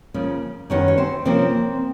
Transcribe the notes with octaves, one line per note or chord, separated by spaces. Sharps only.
C#3 F3 A#3 C#4
F#2 D#3 F#3 B3 C#4 C#5
C#5
C4 C5
C3 F3 A#3 C4 C#4 C5